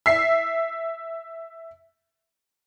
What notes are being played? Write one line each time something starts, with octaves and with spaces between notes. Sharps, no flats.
E5 C7